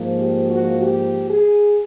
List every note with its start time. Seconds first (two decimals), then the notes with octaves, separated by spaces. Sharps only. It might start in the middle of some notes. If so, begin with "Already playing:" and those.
Already playing: G#2 F3 A#3
0.19 G4
0.50 F#4
0.82 G4
1.30 G#4